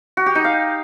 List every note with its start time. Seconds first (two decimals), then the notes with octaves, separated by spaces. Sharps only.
0.17 F#4
0.26 G4
0.35 D#4
0.45 F5